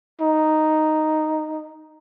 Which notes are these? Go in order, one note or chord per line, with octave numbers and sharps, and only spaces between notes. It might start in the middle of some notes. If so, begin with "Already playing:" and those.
D#4